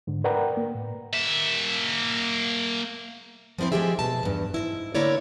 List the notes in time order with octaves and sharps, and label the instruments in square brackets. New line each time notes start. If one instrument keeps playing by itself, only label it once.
[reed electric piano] G#2 D3
A#4 B4 D5 F#5 G5 A#5
A#3
A2
[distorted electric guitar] A#3 E5
[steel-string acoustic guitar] F3 G3 C4 E4 C5
F3 G#3 A3 G4 G#4 E5
B2 A5
E2 G2
G#2 B2 E4
D3 A#3 B3 E4 C#5 D5